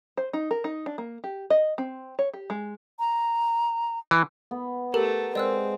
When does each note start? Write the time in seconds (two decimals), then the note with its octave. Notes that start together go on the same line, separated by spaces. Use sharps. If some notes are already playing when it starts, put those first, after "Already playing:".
0.17 C5
0.33 D#4
0.51 A#4
0.64 D#4
0.86 D4
0.98 A#3
1.24 G4
1.50 D#5
1.78 C4
2.19 C#5
2.34 G4
2.50 G#3
2.99 A#5
4.11 E3
4.51 B3
4.94 A3 G4 A4 A#4
5.35 G#3 C4 D5 E6 F#6